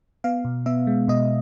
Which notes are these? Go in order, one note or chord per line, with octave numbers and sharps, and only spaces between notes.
B3 F5
B2
B3 E5
G#3
B2 D#5